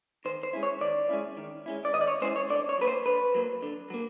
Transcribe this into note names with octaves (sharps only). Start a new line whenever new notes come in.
D#3 C5
C5
G#3 C#4 E4
C#5
D#3 D5
G#3 C#4 E4
D#3
G#3 C#4 E4
D5
D#3 D#5
D5
C#5
G#3 C#4 E4 C5
C#5
D3 D5
C#5
F#3 A#3 B4
C5
D3 B4
F#3 A#3
D3
F#3 A#3